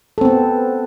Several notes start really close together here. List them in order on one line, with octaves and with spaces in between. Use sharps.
A4 C4 B3